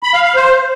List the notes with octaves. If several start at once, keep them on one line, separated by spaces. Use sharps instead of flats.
B5
F5
F5
C5